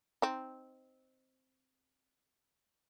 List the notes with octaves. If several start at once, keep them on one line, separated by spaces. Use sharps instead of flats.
C4 D#4